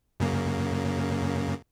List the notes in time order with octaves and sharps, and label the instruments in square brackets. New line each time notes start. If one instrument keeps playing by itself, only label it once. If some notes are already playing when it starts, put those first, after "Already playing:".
[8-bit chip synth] F#2 C#3 A#3